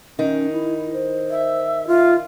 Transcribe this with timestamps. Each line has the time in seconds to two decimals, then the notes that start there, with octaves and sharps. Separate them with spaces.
0.19 D#3 C#4 D#4
0.52 E4
0.93 C5
1.30 E5
1.87 F4 E5